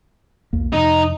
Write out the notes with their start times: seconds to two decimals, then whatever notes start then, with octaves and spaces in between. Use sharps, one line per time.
0.53 B1 E2 A#3
0.73 F2 C3 F3 D#4